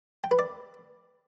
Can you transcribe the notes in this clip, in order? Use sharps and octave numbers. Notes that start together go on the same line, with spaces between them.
G5
B4
D5